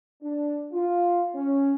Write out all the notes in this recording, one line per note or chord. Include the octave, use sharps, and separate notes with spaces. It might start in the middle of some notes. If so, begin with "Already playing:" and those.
D4
F4
C#4